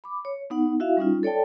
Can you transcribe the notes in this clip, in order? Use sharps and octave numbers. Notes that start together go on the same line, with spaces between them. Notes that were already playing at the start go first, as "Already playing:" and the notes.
B5 D6
C#5
B3 D#4 F#5
E4 F#4 E5 F5
G3 C#4 D#4 F4
A4 C#5 D5 G5 A5